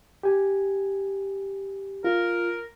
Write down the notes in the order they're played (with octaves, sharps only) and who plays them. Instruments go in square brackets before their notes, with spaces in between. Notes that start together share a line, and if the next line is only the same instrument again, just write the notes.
[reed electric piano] G4 G#5
[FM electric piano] F4 [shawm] A#4